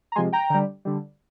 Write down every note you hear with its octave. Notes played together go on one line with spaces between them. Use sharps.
A#5
C3 F3 G#3 G#5 C6
G5 A#5
D3 G3
D3 G3